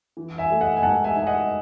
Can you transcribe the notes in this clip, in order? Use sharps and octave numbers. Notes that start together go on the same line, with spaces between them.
E3
E5 G#5
A3
D#5 F#5
G#5
G#2 F#5 A5
E5 G#5
D#4 G#5
D#5 F#5